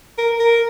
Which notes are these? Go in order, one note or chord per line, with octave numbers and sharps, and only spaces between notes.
A#4
A#4